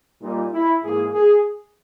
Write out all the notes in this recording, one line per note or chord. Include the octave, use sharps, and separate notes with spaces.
A#2 G3 A#3 D#4
E4
G#2 E3 A#3 G#4
G#4